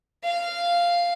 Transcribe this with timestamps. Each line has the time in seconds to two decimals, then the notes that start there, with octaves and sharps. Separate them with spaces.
0.24 F5